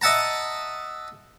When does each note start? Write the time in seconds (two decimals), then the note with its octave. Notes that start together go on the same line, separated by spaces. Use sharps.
0.01 D#5 E5 F#5 A5 A#5